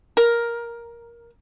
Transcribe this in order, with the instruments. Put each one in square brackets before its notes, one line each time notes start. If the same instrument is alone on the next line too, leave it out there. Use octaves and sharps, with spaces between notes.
[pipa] A#4